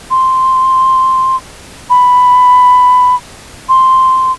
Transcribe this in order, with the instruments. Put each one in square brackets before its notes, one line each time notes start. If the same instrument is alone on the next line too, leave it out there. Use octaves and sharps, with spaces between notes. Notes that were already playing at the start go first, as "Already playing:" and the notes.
[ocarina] C6
B5
C6